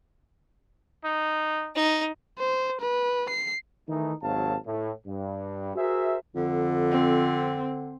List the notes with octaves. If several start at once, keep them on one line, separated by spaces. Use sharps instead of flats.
D#4
D#4
C5
B4
C7
D#3 E3 A3 D#4
G#1 D#2 F#3 C4 F5 A5
A2
G2
F#4 G#4 A#4 C5 E5
F2 D3
C4